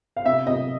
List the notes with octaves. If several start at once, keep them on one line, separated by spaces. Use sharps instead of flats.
F5
C3 E5
C3 D#5